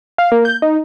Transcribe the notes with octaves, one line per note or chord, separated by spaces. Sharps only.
F5
A#3
G6
D#4